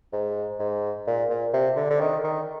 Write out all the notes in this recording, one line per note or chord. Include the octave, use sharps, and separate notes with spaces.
G#2
G#2
A#2
A#2
C3
D3
D3
D#3
D#3